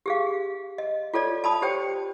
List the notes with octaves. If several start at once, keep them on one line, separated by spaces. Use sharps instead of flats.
G4 G#4 F5
D#5
F4 A4 C#5 D5
A5 B5 D#6
G4 C5 C#5 G5